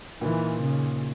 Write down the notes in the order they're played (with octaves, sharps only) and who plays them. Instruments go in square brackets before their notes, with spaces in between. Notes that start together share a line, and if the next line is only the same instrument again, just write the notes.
[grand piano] A#2 A#3 D#4 [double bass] E3
[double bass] C#3